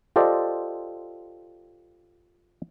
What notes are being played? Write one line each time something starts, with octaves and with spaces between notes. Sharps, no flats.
F4 G4 A4 C5 D5 D#5